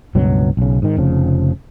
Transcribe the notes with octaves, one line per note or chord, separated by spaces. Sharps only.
C#2 G2 B2 F#3
B1 C#3
G#2 D#3
F1 C#3 F3